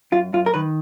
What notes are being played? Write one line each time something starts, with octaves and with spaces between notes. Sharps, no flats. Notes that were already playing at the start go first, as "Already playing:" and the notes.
F#2 F4
F#2 F4
A#4
D#3 B4